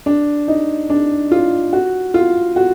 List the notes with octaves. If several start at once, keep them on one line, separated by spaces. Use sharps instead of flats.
D4
D#4
D4
F4
F#4
F4
F#4